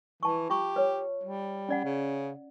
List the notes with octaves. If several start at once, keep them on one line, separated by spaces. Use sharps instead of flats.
E3 A5 C#6
F4 G4 C#6
B4 C#5
G3
C#4 D5 F#5
C#3